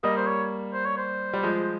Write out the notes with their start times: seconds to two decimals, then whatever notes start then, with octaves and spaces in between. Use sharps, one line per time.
0.03 G3 A#3 D#5
0.17 C5
0.26 C#5
0.73 C5
0.85 C#5
0.97 C5
1.33 G3
1.43 F3 G#3